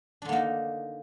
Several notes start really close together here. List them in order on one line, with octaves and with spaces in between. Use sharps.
D4 D3 A#3 D#4